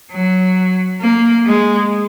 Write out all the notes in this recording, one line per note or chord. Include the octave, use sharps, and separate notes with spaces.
F#3
A#3
G#3